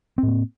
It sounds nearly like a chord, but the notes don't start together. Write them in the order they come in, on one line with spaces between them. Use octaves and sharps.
C4 A2 A#3